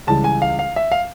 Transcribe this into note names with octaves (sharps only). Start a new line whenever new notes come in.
C#2 C#3 E3 G3 A5
G#5
F5
F5
E5
F5